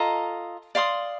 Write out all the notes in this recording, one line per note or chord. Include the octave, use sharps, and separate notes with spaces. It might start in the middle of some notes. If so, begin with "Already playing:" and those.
Already playing: F4 A4 D#5 A#5
D5 F5 C6 D#6